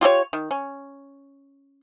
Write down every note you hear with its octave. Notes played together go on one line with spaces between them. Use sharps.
F4 G4 A4 C#5
D#3
C#4